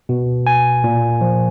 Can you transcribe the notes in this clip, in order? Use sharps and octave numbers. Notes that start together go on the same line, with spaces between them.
B2
G#5
A#2
F3